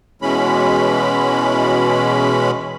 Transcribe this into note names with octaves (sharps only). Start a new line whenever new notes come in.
B2 E3 G#3 C#4 B5